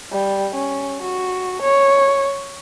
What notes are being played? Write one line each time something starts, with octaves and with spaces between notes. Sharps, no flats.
G3
C#4
F#4
C#5